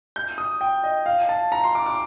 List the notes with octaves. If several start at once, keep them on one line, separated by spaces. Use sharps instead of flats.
G6
D#6
G5
D#5
F5
A5
A#5
C6
D6
D6